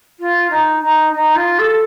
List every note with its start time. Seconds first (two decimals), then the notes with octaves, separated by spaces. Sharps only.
0.20 F4
0.50 D#4
0.82 D#4
1.13 D#4
1.36 F4
1.59 A4